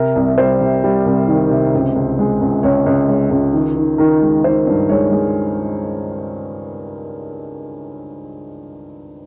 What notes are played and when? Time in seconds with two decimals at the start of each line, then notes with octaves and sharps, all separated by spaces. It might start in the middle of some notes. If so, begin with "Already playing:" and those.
Already playing: C3 A#4
0.16 C2
0.38 G3 C5
0.61 C3
0.84 G3
1.06 C2
1.28 D#3
1.51 C3
1.74 C#2
1.96 C#2
2.19 G#3
2.41 C#2
2.63 C#2 C#5
2.86 C#2
3.08 G#3 C#5
3.31 C#2
3.53 D#3
3.76 D#3
3.98 D#3 A#4
4.22 G#3
4.44 D#3 C5
4.67 G2
4.89 G#3 C#5
5.11 G#3